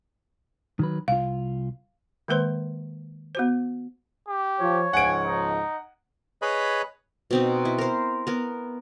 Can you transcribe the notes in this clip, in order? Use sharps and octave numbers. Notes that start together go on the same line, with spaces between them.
D#3 F#3 B4
C2 F4 F5
D#3 G#3 A#3 B4 C5 C6
B3 F#4 C5
G4
F3 C#5
C#2 G#2 F3 F#5 G#5 D7
D#4
G#4 B4 C#5 D#5 B5
B2 C4 D#4
E4
A#4 C5
B3 A#4